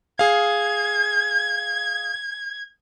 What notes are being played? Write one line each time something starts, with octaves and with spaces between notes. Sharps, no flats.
G#4 F5 G#6